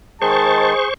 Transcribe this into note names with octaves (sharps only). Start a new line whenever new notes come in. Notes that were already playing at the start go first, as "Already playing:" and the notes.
D#3 G#3 G#4 C5 A5 C#6